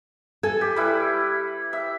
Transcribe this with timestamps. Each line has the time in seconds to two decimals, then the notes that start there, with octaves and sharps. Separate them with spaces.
0.43 A4 G#5
0.61 G4
0.76 G3 E4 B4
1.73 E5